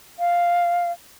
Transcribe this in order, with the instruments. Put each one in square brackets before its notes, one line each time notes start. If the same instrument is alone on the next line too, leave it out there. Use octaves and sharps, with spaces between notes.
[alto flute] F5